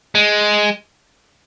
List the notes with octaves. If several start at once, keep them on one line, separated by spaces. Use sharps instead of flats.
G#3